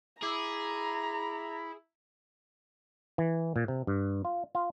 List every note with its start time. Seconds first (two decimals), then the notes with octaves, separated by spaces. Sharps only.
0.23 E4 G#4 A#5 D6 F#7
3.18 E3
3.56 A#2
3.68 C3
3.87 G2
4.25 F4
4.55 F4